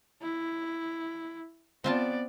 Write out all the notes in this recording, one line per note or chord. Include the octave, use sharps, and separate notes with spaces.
E4
B3 C4 F4 D5 A5